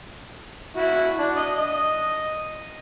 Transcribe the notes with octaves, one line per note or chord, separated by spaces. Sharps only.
E4 F#4
D4
D#5
D#5